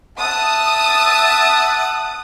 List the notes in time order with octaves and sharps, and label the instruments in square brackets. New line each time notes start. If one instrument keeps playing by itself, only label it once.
[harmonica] E5 F#5 A5 [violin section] D#6